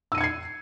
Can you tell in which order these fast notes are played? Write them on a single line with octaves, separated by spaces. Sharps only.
E6 D#7 C#7 G#6 C7